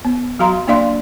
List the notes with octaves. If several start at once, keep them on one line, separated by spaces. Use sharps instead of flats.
B3
F#3 F#4 F5 A#5 C6
A#3 D4 D5 F5 C6